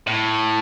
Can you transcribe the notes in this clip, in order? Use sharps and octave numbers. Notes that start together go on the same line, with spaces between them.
A2